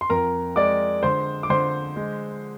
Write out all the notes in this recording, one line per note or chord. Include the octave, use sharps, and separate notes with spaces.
C6
F2 A#4 A#5
G#3 D5 D6
D3 C5 C6
D6
D3 C5 C6
G#3